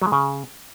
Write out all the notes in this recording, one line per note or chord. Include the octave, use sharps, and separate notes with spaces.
F#3
G#3
C#3